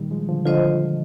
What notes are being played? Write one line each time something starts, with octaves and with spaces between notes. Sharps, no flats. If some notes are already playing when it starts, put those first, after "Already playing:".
Already playing: A#2 D#3 G3
F3 G#3
D3 F3
D3 F3 F4 C5 D#5